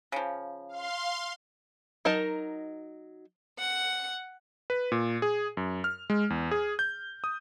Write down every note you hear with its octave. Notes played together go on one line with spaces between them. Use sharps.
C#3 F3
F5 C6
F#3 D#4 A#4 D#5 A5
F#5 C#7
B4
A#2
G#4
F#2
F6
G#3
E2
G#4
G6
D#6